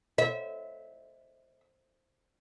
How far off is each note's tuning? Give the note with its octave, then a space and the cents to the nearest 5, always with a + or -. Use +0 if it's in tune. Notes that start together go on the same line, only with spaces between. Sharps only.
E5 -25